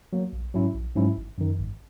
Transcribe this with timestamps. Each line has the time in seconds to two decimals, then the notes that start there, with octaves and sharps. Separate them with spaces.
0.13 F#3 A#3
0.33 A#1
0.54 G#2 F#3 C#4 E4
0.75 A#1
0.95 G#2 F#3 C#4 E4
1.17 G#1
1.38 F#2 D#3
1.58 G#1